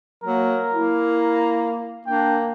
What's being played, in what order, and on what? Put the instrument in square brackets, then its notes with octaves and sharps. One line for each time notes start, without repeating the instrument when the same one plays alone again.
[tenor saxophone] F#3 [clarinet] A#3 [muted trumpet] A#4
[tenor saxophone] A#3 [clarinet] E4
[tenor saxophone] A#3 [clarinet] D4 [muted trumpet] G5